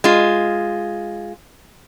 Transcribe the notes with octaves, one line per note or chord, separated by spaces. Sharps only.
G#3 F4